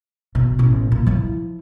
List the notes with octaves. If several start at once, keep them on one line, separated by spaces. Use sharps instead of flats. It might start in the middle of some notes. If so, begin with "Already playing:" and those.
B2
A1 B2
A#2
F3 E4